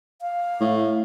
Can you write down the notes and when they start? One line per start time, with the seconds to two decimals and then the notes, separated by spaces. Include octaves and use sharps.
0.21 F5
0.61 A2